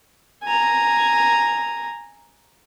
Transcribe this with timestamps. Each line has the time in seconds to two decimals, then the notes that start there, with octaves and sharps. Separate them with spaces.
0.44 G#5 A#5